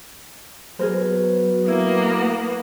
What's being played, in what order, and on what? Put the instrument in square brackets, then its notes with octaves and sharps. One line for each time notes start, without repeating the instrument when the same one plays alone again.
[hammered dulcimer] B2 [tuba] F#3 [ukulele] G#4 A#4 C5
[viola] A#3 B3 [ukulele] E4